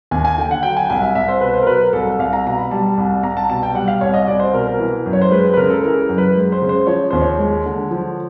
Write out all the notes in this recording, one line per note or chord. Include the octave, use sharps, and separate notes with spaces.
D#2 G#5
G#5
D3 G5
F#5
F#3 G5
G#5
C2 G#5
E5
C2 E5
C5
B2 B4
C5
A#4
F#3 B4
A#4
C2 A4
C2 F5
A#5
B2 A#5
B5
G3 A5
C2
C2 A#5
A5
B2 A5
G5
G3 F#5
F5
C2 C#5
D#5
C2 D5
C5
B2 A#4
A#4
E3
F#2
C#5
C5
G#3 B4
B4
C#3 A#4
A4
E3 A#4
A#4
F#2
B4
G#3
C5
C#3
C5
F3 C#5
D#2 C5
C#5
G#3
D3
F3